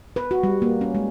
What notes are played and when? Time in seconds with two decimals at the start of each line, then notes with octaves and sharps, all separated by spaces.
0.16 B4
0.31 F#4
0.43 G3
0.62 A#3
0.81 C#4
0.95 G#3